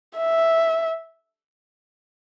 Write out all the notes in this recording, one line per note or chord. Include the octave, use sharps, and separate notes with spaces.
E5